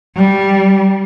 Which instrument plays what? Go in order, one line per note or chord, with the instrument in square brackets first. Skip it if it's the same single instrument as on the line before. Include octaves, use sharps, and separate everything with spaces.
[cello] G3